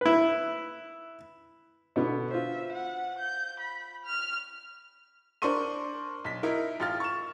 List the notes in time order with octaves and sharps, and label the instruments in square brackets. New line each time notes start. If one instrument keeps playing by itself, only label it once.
[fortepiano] E4 B4
B2 D3 B3
[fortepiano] F4 C5 [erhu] E5
[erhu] F#5
G6
B5
F6
[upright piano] D4 A#4 C5 C6 C#6 D#7
B1 B6
D#4 E4 A#4
A1 F4 F6 A6
C#6 E7